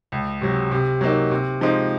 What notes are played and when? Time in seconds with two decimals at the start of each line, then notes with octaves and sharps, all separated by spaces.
0.12 C#2
0.41 C3 F#3
0.71 C3
1.01 F#3 A#3 D#4
1.31 C3
1.61 F3 G#3 C4 D#4